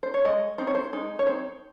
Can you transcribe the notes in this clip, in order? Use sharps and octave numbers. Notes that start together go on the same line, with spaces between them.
C5
C#5
G#3 D#5
C4 D#4 C5
C#5
C5
G#3 D#4
C#5
C4 D#4 C5